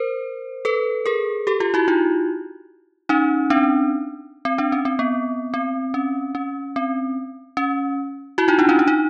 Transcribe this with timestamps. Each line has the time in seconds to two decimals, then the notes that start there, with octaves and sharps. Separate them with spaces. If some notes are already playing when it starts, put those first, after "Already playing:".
Already playing: A#4 C5
0.65 A4 B4
1.06 G#4 A#4
1.47 G4 A4
1.60 F4 G4
1.74 E4 F#4
1.88 D#4 F4
3.09 C#4 D#4
3.50 C4 D4
4.45 C4
4.58 C4 D4
4.72 C#4
4.85 C4
4.99 B3
5.54 C4
5.94 C#4
6.35 C#4
6.76 C4
7.57 C#4
8.38 E4 F#4
8.48 D#4 F4
8.59 D4 E4
8.69 C#4 D#4
8.79 D4
8.88 D#4